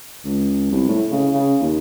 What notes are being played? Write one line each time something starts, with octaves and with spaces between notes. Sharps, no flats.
C#2
C2
A2
C#3
C#3
D#2